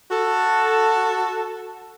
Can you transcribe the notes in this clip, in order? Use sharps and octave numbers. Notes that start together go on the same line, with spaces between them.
F#4 A4